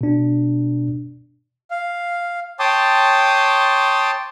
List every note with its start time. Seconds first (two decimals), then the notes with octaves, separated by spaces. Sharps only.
0.01 B2 D4
1.71 F5
2.59 C#5 G5 A5 C6 D6 D#6